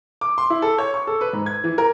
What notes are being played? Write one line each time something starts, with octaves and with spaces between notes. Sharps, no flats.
D6
C6
E4
A4
C#5
C#6
A4
B4
G#2
G#6
E3
A#4